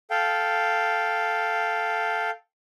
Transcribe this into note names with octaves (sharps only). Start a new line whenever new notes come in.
A4 F5 G5